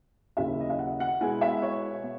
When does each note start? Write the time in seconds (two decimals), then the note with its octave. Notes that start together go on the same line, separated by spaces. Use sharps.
0.37 D#2 C#3 F#3 C#4 E4 E5
0.61 D#5
0.70 E5
0.79 F#5
1.00 F#5
1.21 B2 G#3 B3 E4 G#5
1.41 E5
1.62 C#5
2.03 B3